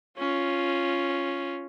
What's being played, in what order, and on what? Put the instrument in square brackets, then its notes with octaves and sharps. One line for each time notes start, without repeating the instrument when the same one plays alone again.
[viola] C#4 F4